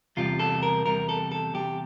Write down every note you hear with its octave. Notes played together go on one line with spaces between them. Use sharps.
E2 C3 G3 F4
A4
A#4
E2 C3 G3 A#4
A4
A4
E2 C3 G3 G4